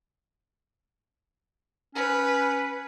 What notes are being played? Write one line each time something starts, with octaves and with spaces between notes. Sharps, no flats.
C#4 B4